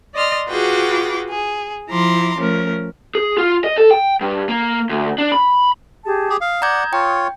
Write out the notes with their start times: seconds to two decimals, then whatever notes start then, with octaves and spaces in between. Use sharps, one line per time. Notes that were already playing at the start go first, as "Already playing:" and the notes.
0.14 D5 D#5 C6 F6
0.47 F4 F#4 G#4 B4 G5 D6
1.28 G#4
1.89 F3 E4 A#5 C6 D6
2.36 F3 A3 C#4 A#4
3.15 G#4
3.38 F4
3.64 D#5
3.77 A4
3.91 G5
4.21 G2
4.49 A#3
4.89 D2
5.18 D4
5.32 B5
6.05 G4 G#4 A5
6.30 G4 G#4
6.41 F5 D#6
6.62 D5 F#5 A#5 G6 G#6
6.93 F4 C#5 G5